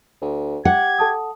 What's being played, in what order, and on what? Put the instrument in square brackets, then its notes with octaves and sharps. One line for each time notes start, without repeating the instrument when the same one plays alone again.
[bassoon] D2
[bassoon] G4 [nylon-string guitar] F#5 [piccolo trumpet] G#6
[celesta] A4 A5 D#6